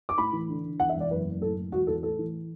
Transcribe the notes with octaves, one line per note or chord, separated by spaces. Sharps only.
D6
A2 B5
E3
D3
D3
E2 F#5
E5
E1
D5
F#1 B4
F#1
A2 A4
A2
E1 F#4
E2 A4
A2 A4
E3